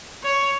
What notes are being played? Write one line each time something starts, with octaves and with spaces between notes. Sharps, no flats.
C#5